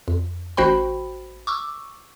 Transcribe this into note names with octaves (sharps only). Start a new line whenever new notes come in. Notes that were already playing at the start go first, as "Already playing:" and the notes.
F2
A1 F#4 C5 G5 B5
C#6 D6 E6